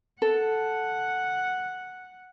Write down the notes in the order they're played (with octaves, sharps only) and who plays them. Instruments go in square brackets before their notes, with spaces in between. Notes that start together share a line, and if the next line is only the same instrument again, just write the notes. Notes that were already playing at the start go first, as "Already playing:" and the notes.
[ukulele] A4 [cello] F#5